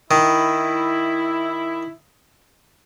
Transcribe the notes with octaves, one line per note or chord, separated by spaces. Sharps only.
D#3 E4